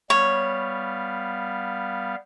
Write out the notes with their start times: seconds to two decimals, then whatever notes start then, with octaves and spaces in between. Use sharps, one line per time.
0.10 G3 B3 C#5 F5